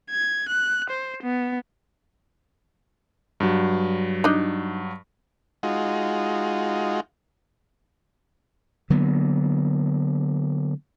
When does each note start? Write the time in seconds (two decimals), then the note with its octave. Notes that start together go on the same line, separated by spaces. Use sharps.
0.11 G#6
0.49 F#6
0.90 C5
1.23 B3
3.40 G2 F#3
4.24 D4 D#4
5.63 G#3 D#4 F4 F#4
8.90 D3 F#3 A#3 B3